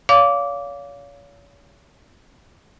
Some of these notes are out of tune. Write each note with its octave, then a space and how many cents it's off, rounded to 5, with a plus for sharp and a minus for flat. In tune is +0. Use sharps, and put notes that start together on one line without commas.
C#5 +40 F5 +0 D6 -15